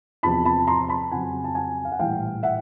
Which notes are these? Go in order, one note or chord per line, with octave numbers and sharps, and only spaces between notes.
E2 C3 F3 A5 B5
A5 B5
A#5 C6
A5 B5
F2 C#3 F#3 F#5 G#5
A5
F#5 G#5
F5
F#5
A#1 A2 E3 G3 F5 G5
E5 F#5